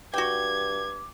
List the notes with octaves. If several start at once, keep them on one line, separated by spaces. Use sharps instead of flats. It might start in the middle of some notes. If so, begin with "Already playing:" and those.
G2 F#4 G5 D6 G#6